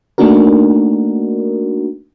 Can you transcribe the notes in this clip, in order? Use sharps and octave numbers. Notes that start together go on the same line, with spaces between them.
A3 A#3 D4 D#4 F#4 A#4